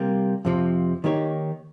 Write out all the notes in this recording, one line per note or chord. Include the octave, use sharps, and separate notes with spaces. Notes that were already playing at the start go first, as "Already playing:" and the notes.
Already playing: C3 G3 A#3
F2 C3 F3 C4
D#3 A#3 D#4 G4 C#5